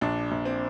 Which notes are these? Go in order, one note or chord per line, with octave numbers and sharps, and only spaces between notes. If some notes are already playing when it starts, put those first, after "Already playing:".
A#1 D4
A#1
C4